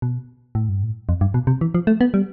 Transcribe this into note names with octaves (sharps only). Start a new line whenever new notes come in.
B2
A2
G2
A2
F2
G2
B2
C3
E3
F3
A3
B3
G3